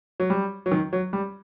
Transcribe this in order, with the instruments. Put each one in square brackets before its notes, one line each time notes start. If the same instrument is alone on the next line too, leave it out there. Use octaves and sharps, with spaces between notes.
[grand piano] F#3
G3
F#3
D#3
F#3
G3